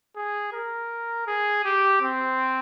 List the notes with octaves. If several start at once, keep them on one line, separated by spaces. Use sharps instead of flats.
G#4
A#4
G#4
G4
C4